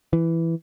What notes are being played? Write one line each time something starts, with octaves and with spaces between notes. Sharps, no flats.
E3